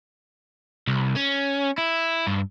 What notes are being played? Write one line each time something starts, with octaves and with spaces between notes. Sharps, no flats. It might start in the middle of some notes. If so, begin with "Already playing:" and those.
C2
C#4
E4
G2